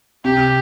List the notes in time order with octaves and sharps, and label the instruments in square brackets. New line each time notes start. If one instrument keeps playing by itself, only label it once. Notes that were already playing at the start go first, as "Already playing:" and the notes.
[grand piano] C3 [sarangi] G4